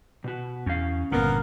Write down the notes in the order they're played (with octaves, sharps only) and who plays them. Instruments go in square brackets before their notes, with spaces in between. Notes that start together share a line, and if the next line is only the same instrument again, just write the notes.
[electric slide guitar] B2 F#4
[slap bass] E2 [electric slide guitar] C#4 F5
[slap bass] G1 A#2 D3 [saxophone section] A#3 B3 A#4